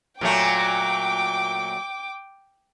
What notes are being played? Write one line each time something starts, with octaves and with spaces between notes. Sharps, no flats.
A#2 F#3 A3 G5 D6